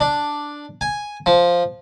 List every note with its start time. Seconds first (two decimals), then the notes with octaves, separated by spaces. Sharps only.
0.01 D4
0.81 G#5
1.26 F3